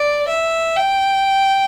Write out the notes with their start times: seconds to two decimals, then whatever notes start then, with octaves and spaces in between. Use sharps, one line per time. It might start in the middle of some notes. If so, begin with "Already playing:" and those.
Already playing: D5
0.27 E5
0.77 G5